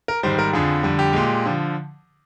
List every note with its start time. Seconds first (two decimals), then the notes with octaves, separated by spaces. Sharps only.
0.08 A#4
0.23 G#2 D#3 G3 C5
0.39 A#4
0.53 F2 D3 F3 G#4
0.83 F2 D3 G3
0.99 G4
1.13 A#2 G#3
1.45 D3 F3